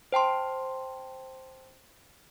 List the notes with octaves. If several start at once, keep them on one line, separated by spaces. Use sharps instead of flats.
C5 G5 A5 C6